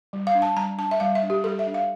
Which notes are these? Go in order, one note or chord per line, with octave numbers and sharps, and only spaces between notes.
G3
F5
D4
A5
G3 A#5
D4 A5
E5
G3 F5
E5
D4
G4
G3 A4
E5
D4
F5